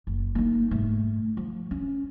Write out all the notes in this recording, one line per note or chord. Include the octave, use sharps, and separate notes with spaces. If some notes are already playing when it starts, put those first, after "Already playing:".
F#1
A#3 D#4
G#2 A3
F3
C#4